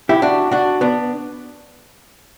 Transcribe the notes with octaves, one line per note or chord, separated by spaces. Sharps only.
E4 G4
D4 F#4
D4 F#4
B3 D4